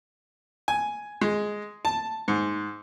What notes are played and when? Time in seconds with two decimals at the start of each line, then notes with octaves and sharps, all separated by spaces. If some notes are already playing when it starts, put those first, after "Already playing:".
0.68 G#5
1.21 G#3
1.85 A5
2.28 G#2